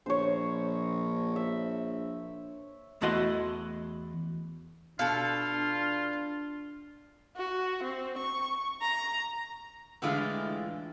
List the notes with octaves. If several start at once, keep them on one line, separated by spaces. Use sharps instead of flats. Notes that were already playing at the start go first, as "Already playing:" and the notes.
A#1 C5 C#5
E5
E2 A3 E4 F#4 D#5 C6
B2 D4 F4 A4 F5
F#4
C4
C#6
A#5
A2 D3 E3 G#3 E4 F4